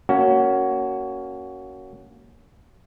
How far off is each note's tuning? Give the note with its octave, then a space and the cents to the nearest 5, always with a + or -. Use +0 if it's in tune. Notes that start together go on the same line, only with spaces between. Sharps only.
A#3 +0 C#4 +15 F#4 +15